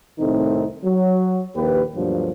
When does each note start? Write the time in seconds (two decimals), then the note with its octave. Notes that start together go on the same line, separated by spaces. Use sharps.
0.19 C2 A2 D#3 A3 C4 D#4
0.84 F#3
1.55 A#1 D#2 A#3 G4 B4
1.95 D2 G2 B2 F3 F#3 A#3